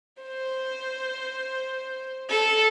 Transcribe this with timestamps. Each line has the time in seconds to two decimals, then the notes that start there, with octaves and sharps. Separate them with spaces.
0.23 C5
2.30 A4